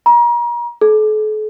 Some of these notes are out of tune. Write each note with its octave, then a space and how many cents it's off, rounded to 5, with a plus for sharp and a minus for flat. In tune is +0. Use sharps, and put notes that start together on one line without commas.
A#5 +35
A4 -45